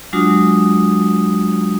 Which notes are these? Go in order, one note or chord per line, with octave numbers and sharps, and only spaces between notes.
F#3 G#3 D4 F4 F#4 D#6